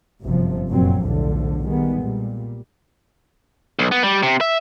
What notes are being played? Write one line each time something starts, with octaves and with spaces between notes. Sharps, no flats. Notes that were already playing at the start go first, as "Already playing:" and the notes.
G1 F#2 C3 F3
F1 F#2 A#2 F#3 C4
B1 E2 A2 D3 F3
D#3 G3 G#3 B3
A#2 G3
B1
B3
G3
C3
E5